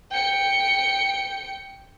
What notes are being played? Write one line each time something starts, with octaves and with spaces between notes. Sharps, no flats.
G5 C#7